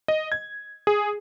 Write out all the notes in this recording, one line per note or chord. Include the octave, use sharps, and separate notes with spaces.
D#5
G#6
G#4